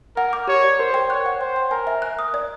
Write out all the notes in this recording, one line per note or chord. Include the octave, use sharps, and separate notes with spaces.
A#4 F#5
D6
G4 C#5
D5
A#4 C5
G5
C#5 F#6
F#5
C5 G5
G5
A#4 G#5
E5
F#6
D#6
D5